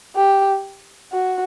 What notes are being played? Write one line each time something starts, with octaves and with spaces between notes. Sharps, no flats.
G4
F#4